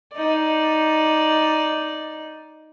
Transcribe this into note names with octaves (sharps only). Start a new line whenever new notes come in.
D#4 D5